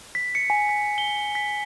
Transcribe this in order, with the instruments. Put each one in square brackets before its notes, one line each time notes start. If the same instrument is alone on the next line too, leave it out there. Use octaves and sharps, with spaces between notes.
[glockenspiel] B6
C#7
G#5
B6
G7
B6